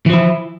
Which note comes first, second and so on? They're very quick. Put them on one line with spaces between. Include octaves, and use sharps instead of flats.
E3 F3 E4